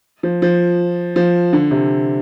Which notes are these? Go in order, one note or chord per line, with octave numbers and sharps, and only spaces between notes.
F3
F3
F3
D3
C3